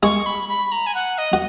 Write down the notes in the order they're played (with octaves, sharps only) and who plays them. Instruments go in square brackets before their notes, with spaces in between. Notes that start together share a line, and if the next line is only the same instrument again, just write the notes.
[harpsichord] G#3 G#4 [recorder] C#6
[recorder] B5
B5
A#5
G#5
F#5
D#5
[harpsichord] F#4